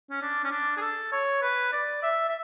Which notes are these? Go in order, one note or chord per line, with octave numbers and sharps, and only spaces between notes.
C#4
D4
C#4
D4
G#4
A4
C#5
B4
D5
E5
E5